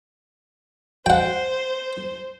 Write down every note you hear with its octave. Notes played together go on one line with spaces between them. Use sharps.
C5 F#5 G5